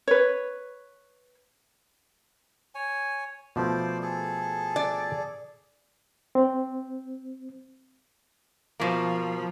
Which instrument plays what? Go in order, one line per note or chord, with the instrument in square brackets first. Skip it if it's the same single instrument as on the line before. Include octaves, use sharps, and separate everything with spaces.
[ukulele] B4 C#5
[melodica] C#5 G#5
[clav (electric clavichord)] B2 F3 A3 [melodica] C5 D5
[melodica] G#4 A4
[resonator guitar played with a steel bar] D5
[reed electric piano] C4
[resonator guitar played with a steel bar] B2 A#3 [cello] F3